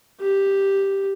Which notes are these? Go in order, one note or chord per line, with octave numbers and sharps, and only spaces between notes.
G4